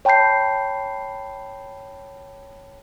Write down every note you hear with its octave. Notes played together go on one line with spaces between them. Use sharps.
C#5 G5 A5 B5 G6 C7